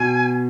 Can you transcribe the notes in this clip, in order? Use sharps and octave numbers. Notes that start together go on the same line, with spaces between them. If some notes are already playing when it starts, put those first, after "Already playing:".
Already playing: B2 G#5